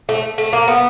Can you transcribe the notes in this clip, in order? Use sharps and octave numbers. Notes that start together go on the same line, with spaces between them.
A3
A3
A#3
B3